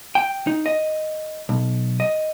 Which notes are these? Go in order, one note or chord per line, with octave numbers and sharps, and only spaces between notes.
G5
D#4
D#5
B1
D#5